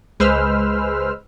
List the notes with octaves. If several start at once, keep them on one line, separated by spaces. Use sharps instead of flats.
C#2 G#3 B4 C5 E6 F6